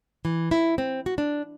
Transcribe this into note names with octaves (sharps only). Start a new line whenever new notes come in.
E3
E4
C4
F#4
D4